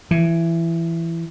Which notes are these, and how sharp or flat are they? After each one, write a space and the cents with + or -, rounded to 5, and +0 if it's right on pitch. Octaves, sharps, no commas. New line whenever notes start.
E3 +15